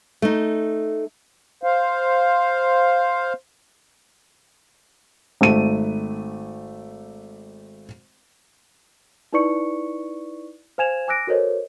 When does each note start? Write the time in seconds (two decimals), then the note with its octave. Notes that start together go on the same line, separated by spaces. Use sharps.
0.22 A3 D#4
1.63 C5 F5
5.41 G#1 A3 D#7
9.33 D#4 E4 B4 D5 C#6 C#7
10.78 C5 F5 G#5 G#6 E7 F7
11.08 G#5 D6 E6 F#6 A#6 D7
11.27 F#4 A4 A#4 C5 C#5 D#5